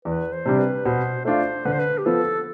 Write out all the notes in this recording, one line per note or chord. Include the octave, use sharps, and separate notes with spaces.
E2 B4
C5
C3 G3 D4
B4
B2 C5
A3 D4 F4 C5
D3 B4
C5
B4
G4
F3 B3 A4